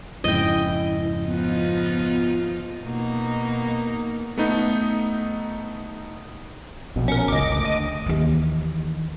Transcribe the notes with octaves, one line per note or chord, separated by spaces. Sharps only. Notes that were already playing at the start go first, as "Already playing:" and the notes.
F2 G#2 C#3 E4 D#5 G5
F3 B3 D#4 F4
B2 A#3 D#4
A3 B3 D#4
A#1 B2
C#4 A#4
F#1 C#2 D#5 D6
D2 D6 D7
D#5 D#7
D#2 E3